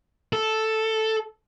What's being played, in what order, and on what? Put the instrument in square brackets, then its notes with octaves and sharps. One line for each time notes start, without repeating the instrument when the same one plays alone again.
[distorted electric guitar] A4